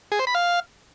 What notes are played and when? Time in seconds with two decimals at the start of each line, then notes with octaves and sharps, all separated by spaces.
0.12 G#4
0.19 C5
0.27 B5
0.35 F5